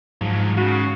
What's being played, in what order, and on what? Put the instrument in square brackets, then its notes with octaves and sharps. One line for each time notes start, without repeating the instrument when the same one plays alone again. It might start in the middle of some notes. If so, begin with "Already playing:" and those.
[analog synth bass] G#2 [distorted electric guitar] F3 F#3
[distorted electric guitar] C#3 [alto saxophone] F#4